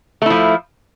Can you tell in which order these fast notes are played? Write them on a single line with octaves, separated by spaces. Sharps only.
A3 E4 F3